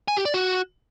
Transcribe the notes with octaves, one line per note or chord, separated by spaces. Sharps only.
G#5
G4
D5
F#4